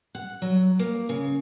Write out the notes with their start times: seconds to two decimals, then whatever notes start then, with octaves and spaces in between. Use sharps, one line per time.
0.15 F#5
0.42 F#3
0.79 A#3
1.09 C#3